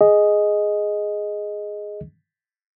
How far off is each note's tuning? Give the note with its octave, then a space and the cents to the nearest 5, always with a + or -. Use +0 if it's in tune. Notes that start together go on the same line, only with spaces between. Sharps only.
G#4 +5 D#5 +0